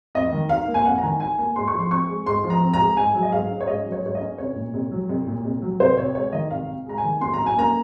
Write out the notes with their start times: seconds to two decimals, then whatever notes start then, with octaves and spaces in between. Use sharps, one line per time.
0.15 F2 D#5
0.32 D#3
0.49 D#4 F5
0.67 A#3
0.74 G#5
0.85 F2 F#5
0.98 A#5
1.03 D#3 G#5
1.20 D#4 G#5
1.38 A#3 G#5
1.56 G#2 C6
1.68 C#6
1.74 F3 C6
1.91 C4 C#6
2.08 G#3
2.26 G#2 C6
2.44 F3
2.50 A#5
2.62 C4
2.74 A#5
2.80 G#3
2.97 G#2 G#5
3.15 F#3
3.23 D#5
3.32 G#2 F5
3.51 C#4
3.60 C#5
3.67 G#2 D#5
3.85 F#3
3.92 C#5
4.03 G#2 C#5
4.15 D#5
4.20 C#4
4.38 C2 C#5
4.56 A#2
4.74 C2
4.91 F#3
5.09 C2
5.27 A#2
5.45 C2
5.62 F#3
5.80 C2 C5
5.97 C3 C#5
6.15 G#3 C#5
6.33 D#3 D#5
6.51 C2 F5
6.68 C3
6.86 G#3 A#5
6.98 G#5
7.04 D#3
7.21 F#1 C6
7.34 A#5
7.39 F#2
7.46 G#5
7.57 A#3 A#5